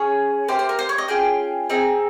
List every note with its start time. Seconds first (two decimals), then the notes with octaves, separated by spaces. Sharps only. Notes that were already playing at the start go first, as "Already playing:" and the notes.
Already playing: C#4 G#4 C#5
0.48 D#4 G4 C5
0.52 A#3
0.59 C5
0.69 A#4
0.79 C5
0.89 C#5
0.98 D#5
1.08 C#4 F4 G#4 G5
1.70 C4 D#4 G#4